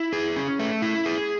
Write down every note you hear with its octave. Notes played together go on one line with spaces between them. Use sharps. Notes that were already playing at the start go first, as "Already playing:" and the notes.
Already playing: E4
G#4
C#4
A3
E4
G#4